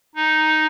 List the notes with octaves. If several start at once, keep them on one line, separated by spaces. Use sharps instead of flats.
D#4